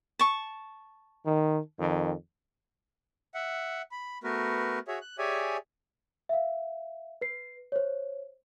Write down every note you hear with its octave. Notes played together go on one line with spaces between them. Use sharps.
A5 C#6
D#3
F2 D#3
E5 F#5
B5
A3 B3 F#4 A#4 B4
F#4 G#4 C#5 E5
F#6
G4 G#4 C#5 D5 E5 G#5
E5 F5
B4 C7
C5 C#5